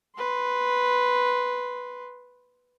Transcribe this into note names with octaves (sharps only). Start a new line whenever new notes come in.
B4 C6